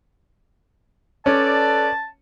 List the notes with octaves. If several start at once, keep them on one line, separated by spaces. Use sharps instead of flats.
C#4 A4 B4 D5 A5